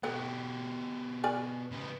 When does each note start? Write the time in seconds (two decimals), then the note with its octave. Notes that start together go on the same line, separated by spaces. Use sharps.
0.03 B2 G4 A4 D#5 F#5
1.24 A#4 D5 G#5
1.71 C#3 B3